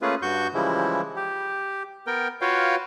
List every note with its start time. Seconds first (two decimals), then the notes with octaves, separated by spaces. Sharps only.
0.02 A3 A#3 C#4 F4 G#4 B4
0.22 G2 F#4 C#6 G6
0.54 C#3 E3 F3 G3 G#3 E4
1.16 G4
2.07 B3 A#4 G5
2.41 F4 F#4 B4 C#5 F5 G5